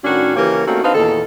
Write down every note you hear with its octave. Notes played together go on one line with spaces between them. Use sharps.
A2 D#3 C#4 D4 F#4
C#3 E3 A#3 C#4 G4 A#4
A3 A#3 C4 C#4 D#4 F#4
C4 D4 D#4 B4 C5 F5
E2 A#2 D#3 A4